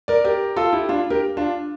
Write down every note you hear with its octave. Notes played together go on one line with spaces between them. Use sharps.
A#4 D5
G4 A#4
F4 A4
E4 G4
D4 F4
G4 A#4
D4 F4